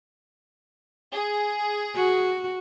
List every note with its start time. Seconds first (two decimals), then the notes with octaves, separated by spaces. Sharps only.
1.12 G#4
1.96 F#4